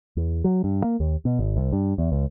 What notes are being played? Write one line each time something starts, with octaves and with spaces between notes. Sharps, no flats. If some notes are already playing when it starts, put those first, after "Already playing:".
E2
F#3
G2
A#3
D#2
B2
G#1
C2
G2
E2
C#2